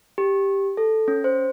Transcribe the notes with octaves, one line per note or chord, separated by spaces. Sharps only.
G4
A4
C#4
C5